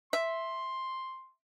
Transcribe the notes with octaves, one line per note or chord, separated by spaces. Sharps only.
E5 C6